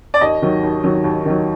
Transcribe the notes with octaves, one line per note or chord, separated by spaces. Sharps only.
D5
D#2 D#5
D#3 F#3
D#2
D#3 F#3
D#2
D#3 F#3